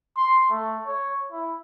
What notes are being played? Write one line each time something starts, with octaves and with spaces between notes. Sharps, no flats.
C6
A3
C#5
E4